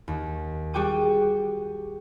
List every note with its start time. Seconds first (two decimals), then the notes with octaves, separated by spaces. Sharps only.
0.08 D#2
0.74 G3 F#4 G#4 G5 D6 D#7